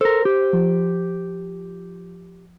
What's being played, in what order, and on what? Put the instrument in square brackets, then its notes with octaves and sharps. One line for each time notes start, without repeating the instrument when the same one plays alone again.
[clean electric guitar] A4 A#4 [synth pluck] C5
[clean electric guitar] G4
[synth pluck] F3